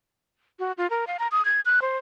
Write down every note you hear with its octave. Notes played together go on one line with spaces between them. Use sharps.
F#4
F4
A#4
F5
A#5
D#6
G#6
F#6
C5